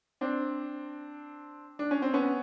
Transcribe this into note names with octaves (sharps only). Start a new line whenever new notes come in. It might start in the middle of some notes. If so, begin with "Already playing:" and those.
C4 D4
D4
C#4
C4
B3 C#4